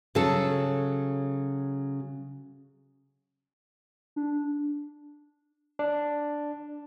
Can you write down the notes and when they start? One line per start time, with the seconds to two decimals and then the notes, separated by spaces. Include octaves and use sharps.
0.15 C#3 F#3 A4
4.16 D4
5.79 D4